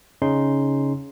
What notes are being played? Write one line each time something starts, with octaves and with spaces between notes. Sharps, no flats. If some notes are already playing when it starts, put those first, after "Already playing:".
C#3 C#4 D#4 C6